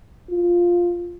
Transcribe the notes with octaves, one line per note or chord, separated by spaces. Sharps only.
F4